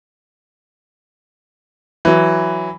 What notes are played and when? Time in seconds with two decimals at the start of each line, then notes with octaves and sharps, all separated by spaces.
2.05 E3 F#3